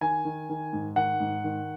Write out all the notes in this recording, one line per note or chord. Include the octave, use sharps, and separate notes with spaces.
D#3 G#5
D#3
D#3
G#2
D#3 F#5
G#2
D#3